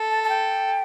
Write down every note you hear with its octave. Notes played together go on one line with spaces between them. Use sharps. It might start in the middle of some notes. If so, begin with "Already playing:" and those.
Already playing: A4
A5
A5
G5